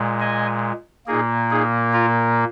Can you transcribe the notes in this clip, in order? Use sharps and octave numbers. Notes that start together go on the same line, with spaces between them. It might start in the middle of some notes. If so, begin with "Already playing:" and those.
Already playing: A#2 G#3
D#5 G#5
A#2 A#3 D#4 G#4
D#4 G#4
F4 A#4